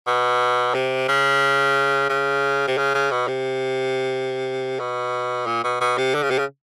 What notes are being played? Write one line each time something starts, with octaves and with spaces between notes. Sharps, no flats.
B2
C3
C#3
C#3
C3
C#3
C#3
B2
C3
B2
A#2
B2
B2
C3
D3
C#3
C3
C#3